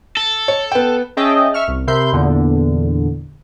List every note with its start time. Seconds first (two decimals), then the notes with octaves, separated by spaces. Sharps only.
0.17 A4
0.48 C#5
0.72 B3 G5
1.17 C#4 G#4 D#5 E5 G5 A5
1.54 E5 C#6 F6
1.68 C2
1.87 C3 A#4 E5 B5 C6 G6
2.13 E2 A#2 D3